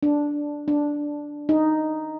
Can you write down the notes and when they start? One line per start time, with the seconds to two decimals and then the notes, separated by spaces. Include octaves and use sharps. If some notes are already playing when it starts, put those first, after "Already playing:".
0.03 D4
0.68 D4
1.49 D#4